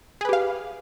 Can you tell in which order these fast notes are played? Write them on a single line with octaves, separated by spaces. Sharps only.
G#4 B4 G4 F5